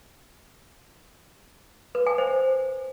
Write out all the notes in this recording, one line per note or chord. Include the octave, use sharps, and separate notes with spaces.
B4
G#5
C5